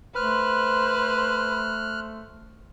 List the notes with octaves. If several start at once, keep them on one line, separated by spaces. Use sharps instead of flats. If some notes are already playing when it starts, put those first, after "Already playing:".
A3 B4 C5 F6 F#6